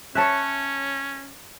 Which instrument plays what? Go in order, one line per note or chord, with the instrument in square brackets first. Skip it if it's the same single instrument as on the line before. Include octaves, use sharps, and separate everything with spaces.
[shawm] C#4 [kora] C#5 E5 [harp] A5 F#6